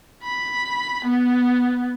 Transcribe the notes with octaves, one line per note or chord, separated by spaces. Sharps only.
B5
B3